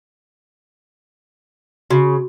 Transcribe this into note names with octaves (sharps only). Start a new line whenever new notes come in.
C#3 F#4